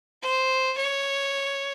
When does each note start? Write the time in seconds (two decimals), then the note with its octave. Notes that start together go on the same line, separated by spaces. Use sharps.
0.22 C5
0.77 C#5